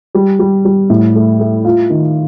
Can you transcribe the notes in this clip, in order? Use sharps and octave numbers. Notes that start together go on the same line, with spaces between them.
G3
G3
G3
A2
A3
A3
F4
D#3